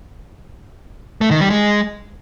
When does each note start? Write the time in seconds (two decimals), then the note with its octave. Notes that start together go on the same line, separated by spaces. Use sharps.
1.21 A3
1.31 D#3
1.41 G3
1.50 G#3